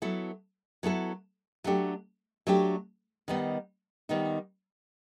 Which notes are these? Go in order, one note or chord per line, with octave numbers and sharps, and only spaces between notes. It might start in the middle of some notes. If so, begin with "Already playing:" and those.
F#3 B3 E4 A4
F#3 B3 E4 A4
F#3 A3 D4 G4
F#3 A3 D4 G4
D#3 G3 B3 D#4
D#3 G3 B3 D#4